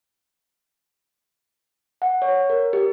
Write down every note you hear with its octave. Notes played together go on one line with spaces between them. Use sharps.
F#5
C#5
A#4
G4